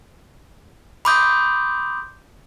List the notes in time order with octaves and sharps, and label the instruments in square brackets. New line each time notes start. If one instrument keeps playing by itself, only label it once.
[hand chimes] B5 C6 D6 D#6 G6